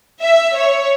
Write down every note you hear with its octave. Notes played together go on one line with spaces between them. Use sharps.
E5
C#5